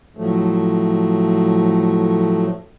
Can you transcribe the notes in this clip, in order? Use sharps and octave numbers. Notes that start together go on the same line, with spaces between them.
A2 F3 F#3 A3